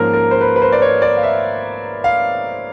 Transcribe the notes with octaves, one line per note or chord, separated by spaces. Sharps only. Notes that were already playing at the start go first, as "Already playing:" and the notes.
Already playing: G#2 F3 A#3 C#4 A#4
A#4
C5
B4
B4
C5
D5
C#5
D5
F5
E5
F5